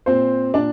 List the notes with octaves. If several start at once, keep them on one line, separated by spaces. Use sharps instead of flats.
A#2 C4 C5
A#2 D4 D5